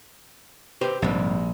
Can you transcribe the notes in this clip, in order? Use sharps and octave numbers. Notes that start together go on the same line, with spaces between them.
G4 B4 C5
A#1 G#2 C3 G3